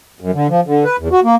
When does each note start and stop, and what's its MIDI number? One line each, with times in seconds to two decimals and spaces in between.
0.21 0.31 42
0.34 0.47 50
0.49 0.61 53
0.66 0.84 50
0.85 0.96 71
0.99 1.08 40
1.12 1.20 66
1.24 1.35 58